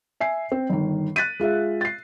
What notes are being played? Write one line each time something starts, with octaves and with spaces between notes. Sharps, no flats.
E5 G#5 C7
C4
G1 D#3
F#6 A6 B6 D#7
G#3 F4 G#4 E5
A6 C7